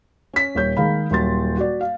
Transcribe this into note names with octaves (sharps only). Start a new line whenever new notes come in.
C#4 B6
D#1 C#5 G6
D#3 G#3 F5 B5
D#1 F#3 C6 A6
F#4 D5
F5